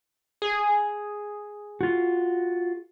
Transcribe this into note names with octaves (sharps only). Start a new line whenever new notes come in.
G#4
F4 F#4